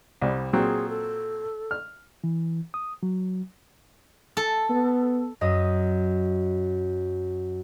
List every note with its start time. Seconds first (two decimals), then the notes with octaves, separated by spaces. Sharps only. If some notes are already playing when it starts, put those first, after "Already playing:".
0.22 C2 G3
0.53 A#2 F#3 C4 G#4
0.89 A4
1.71 F6
2.24 E3
2.74 D#6
3.03 F#3
4.37 A4
4.70 B3
5.41 F#2 D#5